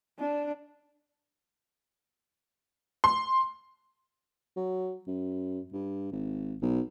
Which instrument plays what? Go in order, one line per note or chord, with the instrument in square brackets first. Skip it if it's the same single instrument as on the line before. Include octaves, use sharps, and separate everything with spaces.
[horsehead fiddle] D4
[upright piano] C6
[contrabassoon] F#3
F#2
G2
G#1
B1